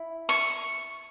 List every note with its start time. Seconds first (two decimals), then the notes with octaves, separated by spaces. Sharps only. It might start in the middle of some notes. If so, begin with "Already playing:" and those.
Already playing: E4
0.29 C#6